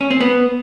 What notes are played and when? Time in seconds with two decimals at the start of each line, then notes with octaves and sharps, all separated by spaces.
0.01 C#4
0.11 C4
0.21 B3